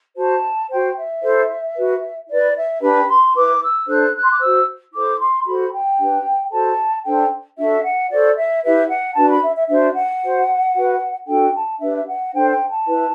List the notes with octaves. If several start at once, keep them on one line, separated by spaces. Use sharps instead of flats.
F#4 C5 A5
F#4 C5 G5
E5
E4 A4 C5
F#4 B4
E4 B4 D5
E5
D4 G4 B4 B5
C6
E4 B4 D6
E6
D4 A4 C5 F#6
F#6
C6
D6
F#4 C5 E6
E4 A4 C5 D6
C6
F#4 A4 C5 B5
G5
D4 G4 B4
F#4 A4 C5 A5
D4 A4 C5 G5
D4 F#4 A4 E5
F#5
F#4 A4 C5 D5
E5
E4 G4 B4 E5
F#5
D4 F#4 B4 A5
B5
E5
E5
D4 F#4 C5 E5
F#5
F#4 C5
F#4 B4
D4 F#4 A4 G5
A5
D4 G4 B4 E5
E5
F#5
D4 A4 C5 G5
G5
A5
E4 B4